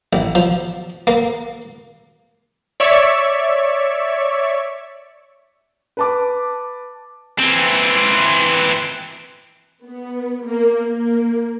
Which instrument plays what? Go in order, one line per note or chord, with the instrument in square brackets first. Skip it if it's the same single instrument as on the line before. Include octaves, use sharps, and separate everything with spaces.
[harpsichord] A1
F3
A#3
[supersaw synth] C#5 D5 E5 C#6
[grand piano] B4 A5 D6
[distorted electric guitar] E3 C4
[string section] B3
A#3
A#3